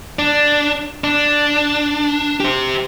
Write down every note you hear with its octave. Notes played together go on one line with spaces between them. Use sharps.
D4
D4
G4 C5